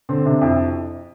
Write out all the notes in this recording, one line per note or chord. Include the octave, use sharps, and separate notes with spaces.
D3 C4
C3 D4
F2 E4